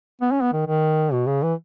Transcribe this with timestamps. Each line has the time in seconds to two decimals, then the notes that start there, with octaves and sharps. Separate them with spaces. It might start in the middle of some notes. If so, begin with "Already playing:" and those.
0.21 B3
0.31 C#4
0.42 B3
0.53 D#3
0.67 D#3
1.12 B2
1.27 C#3
1.43 E3